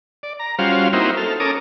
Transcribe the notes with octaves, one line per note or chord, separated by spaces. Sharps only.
D5
A#5
G3 C#4 F4 F#4 C5 F5
A#3 C4 D#4 E4 F#4 C5
A4 F6
C#4 A4 A#4 D6 D#6